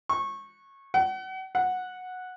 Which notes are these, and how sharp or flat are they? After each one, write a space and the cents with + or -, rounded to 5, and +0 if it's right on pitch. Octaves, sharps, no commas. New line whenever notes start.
C#6 -20
F#5 +35
F#5 -10